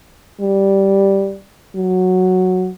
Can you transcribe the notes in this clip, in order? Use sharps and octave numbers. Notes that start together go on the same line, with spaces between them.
G3
F#3